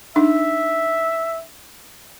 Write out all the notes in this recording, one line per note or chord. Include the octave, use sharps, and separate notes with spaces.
D4 D#4 E5